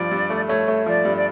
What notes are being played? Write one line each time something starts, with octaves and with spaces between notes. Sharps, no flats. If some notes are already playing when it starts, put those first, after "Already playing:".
Already playing: G2 F3 D5
G2
A3
A3 C#5
A3
F3 D5
G2
D5